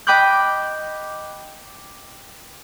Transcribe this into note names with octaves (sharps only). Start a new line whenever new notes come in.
D#5 G5 B5 D6 F#6 G6